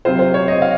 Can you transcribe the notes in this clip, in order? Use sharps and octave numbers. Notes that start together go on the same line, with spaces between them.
C3 F#3 C4 F4 C5
C5
C#5
D#5
F5